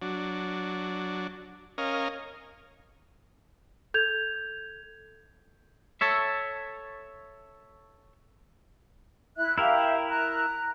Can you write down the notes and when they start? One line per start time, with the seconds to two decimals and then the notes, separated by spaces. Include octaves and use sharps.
0.02 F#3 D4
1.78 C#4 A#4 D#5 F5
3.94 A4 G6 G#6 F7
6.01 A4 C#5 E5
9.37 E4 E5 F#6
9.58 E4 G4 A#4 E5 F5
10.08 A#5 F#6